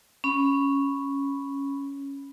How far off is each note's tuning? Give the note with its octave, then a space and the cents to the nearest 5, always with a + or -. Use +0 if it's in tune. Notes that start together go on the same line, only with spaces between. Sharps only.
C#4 +0 B5 +0